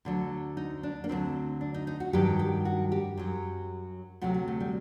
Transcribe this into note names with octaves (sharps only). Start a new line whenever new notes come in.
D2 D3 F#3
D#4
D4
A#3
D2 D3 F#3 C4
D4
D#4
D#4
F#4
G2 D#3 F#3 G4
G4
F#4
G4
F#2 F#3
D2 C3 F#3 F#4
F#4
A3
G3